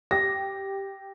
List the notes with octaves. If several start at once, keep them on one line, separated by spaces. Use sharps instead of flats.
G4 A#6